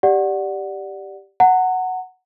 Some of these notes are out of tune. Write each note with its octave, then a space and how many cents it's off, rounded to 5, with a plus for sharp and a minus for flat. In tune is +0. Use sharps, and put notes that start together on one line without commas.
G4 +0 D5 +0 F#5 +0
F#5 +0 A#5 -35